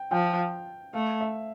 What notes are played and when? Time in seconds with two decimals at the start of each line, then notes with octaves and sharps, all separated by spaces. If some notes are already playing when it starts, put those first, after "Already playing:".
Already playing: G5
0.11 F3 G5
0.93 A3 F5
1.21 E5